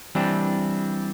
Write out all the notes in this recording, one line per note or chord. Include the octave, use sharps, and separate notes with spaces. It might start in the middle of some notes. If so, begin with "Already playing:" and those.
E3 G3 C4 D4